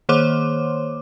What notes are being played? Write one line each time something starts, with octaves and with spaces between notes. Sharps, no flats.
D#3 A#3 C5 C#5 C6 D6